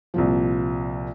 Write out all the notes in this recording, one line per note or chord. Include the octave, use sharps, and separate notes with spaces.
C2 A#2 F3